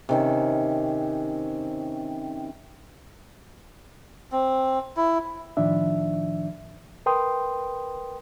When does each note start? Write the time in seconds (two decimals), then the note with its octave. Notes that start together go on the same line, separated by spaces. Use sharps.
0.09 C3 D#3 C#4
4.32 C4
4.97 E4
5.57 A2 D#3 F3 D4 E5
7.06 A#4 B4 G5 C6 D#6